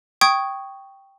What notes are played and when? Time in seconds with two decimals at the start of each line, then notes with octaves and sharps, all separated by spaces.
0.21 G5 C#6 D#6 G#6